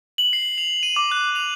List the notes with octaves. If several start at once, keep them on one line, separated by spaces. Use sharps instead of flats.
F#7
C7
F7
D#7
D6
F#6
F7